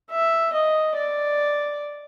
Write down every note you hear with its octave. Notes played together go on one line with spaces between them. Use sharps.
E5
D#5
D5